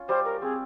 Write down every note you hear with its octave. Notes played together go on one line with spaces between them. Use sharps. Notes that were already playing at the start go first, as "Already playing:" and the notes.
Already playing: C#4 F4
G3 C5
A#4
C4 G#4